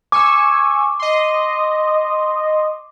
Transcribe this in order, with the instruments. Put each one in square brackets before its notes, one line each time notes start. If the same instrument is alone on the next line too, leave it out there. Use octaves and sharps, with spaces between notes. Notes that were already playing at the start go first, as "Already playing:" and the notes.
[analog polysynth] G#5 C#6 E6 [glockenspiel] D6
[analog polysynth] D#5 C6